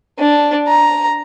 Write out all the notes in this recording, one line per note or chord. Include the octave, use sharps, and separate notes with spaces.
D4
A#5